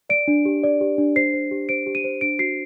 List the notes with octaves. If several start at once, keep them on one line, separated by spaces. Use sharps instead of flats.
D5 D7
D4
G4
D5
G4
D4
C5 C7
C5
G4
C5 D7
G4
D#7
C5
D4 D7
F#4 C7